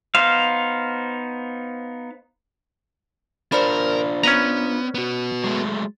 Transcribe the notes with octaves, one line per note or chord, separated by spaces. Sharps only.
B3 D#4 C5 F5
D4 F4 A#4 C5 D5 B5
B3 C#4 B4 A#5
B3 F#4
F#3 G#3 A3